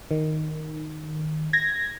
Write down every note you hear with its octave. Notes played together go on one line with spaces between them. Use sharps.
D#3
G#6 A#6